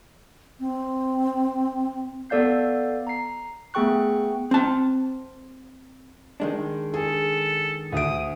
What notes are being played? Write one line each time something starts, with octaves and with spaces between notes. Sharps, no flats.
C4
B3 A4 D5 F5 G6 C7
A#5 C7
A3 B3 G#4 G5 C#6 F#6
C4 A5
D#3 G#3 D4
G#4 A4
D2 D#6 D7